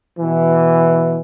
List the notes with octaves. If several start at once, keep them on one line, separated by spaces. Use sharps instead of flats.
B2 E3